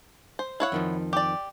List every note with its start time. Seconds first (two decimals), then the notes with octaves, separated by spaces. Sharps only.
0.39 C5
0.60 E4 C#5 F5 F#5
0.72 F2 D#3 F3
1.13 G4 D5